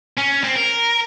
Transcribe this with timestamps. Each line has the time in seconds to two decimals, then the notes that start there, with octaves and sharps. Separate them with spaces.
0.18 C#4
0.44 C4
0.56 A#4